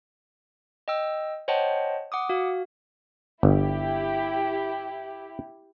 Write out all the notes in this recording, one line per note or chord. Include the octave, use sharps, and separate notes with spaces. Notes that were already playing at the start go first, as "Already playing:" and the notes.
D#5 G5 E6
C5 C#5 D#5 F#5 G5 A5
F#5 D6 D#6
F#4 F5
G1 E4 G4